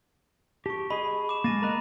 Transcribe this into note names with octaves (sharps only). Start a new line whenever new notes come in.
G4 A5 C#6
G#4 D#5 B5
D6 E7
G#3 A#3 A6 A#6 D#7
A#4 D#5 A#5 B5 F#6